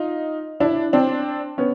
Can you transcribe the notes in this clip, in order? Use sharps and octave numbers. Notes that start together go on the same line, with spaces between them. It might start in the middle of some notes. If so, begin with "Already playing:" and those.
Already playing: D#4 F4
D4 E4
C4 D4
B3 C#4